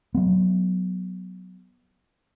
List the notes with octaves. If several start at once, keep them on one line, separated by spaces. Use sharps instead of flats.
F#3 B3